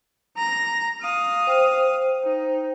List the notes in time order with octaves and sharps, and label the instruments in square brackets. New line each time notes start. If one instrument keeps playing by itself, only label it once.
[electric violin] A#5 A#6
F5 D#6
[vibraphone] C5 G5
[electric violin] D#4